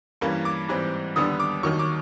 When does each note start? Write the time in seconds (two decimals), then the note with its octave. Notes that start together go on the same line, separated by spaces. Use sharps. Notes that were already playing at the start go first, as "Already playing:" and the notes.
0.21 G2 E3 G3 A#3 C#4
0.45 D6
0.69 G#2 E3 G3 C4
1.16 D#2 D3 G3 B3 D4 D#6
1.40 D6
1.63 D#2 D#3 F#3 C#6
1.79 D6